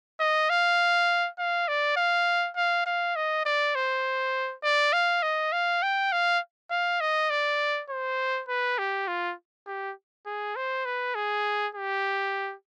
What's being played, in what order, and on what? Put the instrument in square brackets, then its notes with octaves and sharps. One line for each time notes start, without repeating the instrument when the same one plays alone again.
[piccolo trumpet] D#5
F5
F5
D5
F5
F5
F5
D#5
D5
C5
D5
F5
D#5
F5
G5
F5
F5
D#5
D5
C5
B4
G4
F4
G4
G#4
C5
B4
G#4
G4